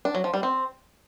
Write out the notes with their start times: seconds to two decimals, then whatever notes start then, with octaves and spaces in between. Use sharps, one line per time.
0.05 D4
0.15 F#3
0.24 F3
0.34 G3
0.43 C4